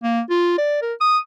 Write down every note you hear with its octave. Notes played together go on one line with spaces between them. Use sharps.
A#3
F4
D5
A#4
D#6